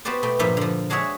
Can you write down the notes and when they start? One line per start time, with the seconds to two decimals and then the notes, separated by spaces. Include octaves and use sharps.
0.05 B3 F#4 G4 C5 D5 G5
0.23 B2 A3 G5
0.39 G2 A#2 F3 G4 E5 G5
0.57 D3 F3
0.90 G#3 D4 F#4 G#4 C#5 E5